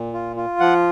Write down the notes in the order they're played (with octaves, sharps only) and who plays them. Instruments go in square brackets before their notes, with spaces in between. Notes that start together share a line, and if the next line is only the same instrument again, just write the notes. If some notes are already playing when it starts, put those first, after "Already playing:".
Already playing: [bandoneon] A#2
F4
F4
F3 F#5